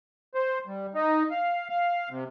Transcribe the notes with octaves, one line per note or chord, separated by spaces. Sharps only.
C5
G3
D#4
F5
F5
C3